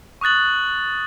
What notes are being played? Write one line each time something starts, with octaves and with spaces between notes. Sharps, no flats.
C#6 D#6 F#6 A6 F#7